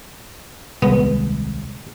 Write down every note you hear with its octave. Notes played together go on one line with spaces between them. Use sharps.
D#1 C2 G#3 B3